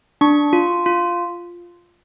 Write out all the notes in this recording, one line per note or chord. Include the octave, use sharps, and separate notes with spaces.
D4 C#6
F4
F4